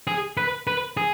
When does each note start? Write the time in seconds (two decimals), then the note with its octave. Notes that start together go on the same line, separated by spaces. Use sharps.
0.07 G#4
0.37 B4
0.67 B4
0.97 G#4